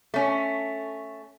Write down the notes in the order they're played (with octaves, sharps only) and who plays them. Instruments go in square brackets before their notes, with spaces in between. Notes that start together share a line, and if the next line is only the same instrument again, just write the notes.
[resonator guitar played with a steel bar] A3 C#4